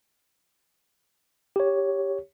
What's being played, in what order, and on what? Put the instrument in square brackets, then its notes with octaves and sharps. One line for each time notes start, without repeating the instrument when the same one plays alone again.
[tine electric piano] G4 C#5